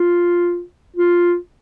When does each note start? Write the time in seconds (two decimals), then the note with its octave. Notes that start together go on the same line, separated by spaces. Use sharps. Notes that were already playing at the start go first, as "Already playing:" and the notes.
Already playing: F4
0.96 F4